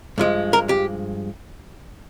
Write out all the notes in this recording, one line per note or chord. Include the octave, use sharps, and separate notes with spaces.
G2 F3 G#3
A#4
G4